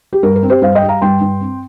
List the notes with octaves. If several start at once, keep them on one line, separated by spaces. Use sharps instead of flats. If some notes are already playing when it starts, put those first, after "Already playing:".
G4
G2 A#4
A#4
C4
G4 C5
G2 C5 F5
D#5 G5
G3
F5 A#5
G2 G5 C6
G2
C4